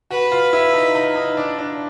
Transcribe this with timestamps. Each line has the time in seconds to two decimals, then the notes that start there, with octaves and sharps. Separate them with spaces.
0.11 F#4 B4
0.32 F4
0.53 E4
0.74 D#4
0.95 D#4
1.16 D#4
1.37 D4
1.58 D4